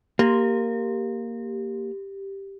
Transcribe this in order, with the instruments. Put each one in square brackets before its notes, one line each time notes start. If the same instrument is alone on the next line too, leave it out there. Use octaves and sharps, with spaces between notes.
[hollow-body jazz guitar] A#3 [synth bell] G4